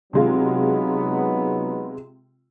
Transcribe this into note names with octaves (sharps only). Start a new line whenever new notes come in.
C3 F#3 G#3 B3 D#4 F4